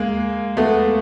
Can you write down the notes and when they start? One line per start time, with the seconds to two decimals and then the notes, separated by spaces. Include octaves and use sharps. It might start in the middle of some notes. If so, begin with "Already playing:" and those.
Already playing: G#3 A#3
0.57 A3 B3